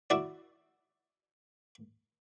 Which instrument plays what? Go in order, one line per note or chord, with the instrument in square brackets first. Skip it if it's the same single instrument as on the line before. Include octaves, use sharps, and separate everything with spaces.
[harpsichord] E4 F#4 D5